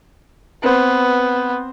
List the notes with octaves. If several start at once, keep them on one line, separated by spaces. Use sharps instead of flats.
B3 C4 B4 C5